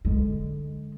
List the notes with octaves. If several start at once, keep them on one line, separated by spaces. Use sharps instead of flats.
D3 G#3